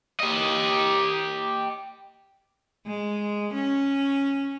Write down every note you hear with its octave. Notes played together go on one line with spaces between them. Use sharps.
G4 D#5
G#3
C#4